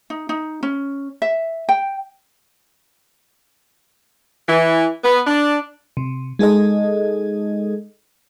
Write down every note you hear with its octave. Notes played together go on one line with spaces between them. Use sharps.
D#4
D#4
C#4
E5
G5
E3
B3
D4
C3
G#3 D#4 G#4 A4 D#5